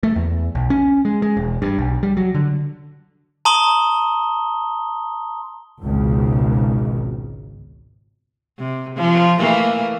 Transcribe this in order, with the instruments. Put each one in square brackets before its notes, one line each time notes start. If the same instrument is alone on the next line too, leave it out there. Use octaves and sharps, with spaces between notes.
[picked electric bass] A3
E2
B1
C#4
G#3
G#3
E1
G2
B1
G3
F#3
D3
[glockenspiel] A5 A#5 C6 D#6 G7
[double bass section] G#1 C#2 B2 D#3
[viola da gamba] C3
F3
E3 A3 A#3